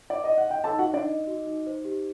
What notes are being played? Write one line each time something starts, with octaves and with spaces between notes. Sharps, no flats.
D5
D#5
F#5
D#5 G5
A4 A5
D#4
F#4 F#5
D4 D#4 D5
D#5
F#4
D#4
C5
G4